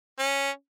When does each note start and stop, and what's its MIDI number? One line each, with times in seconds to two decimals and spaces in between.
0.19 0.51 61